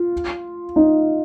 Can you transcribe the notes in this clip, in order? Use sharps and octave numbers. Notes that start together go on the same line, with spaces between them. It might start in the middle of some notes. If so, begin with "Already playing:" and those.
Already playing: F4
D#4